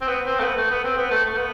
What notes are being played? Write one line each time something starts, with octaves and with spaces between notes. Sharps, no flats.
C4
B3
C4
A3
B3
A3
B3
C4
B3
A3
A3
B3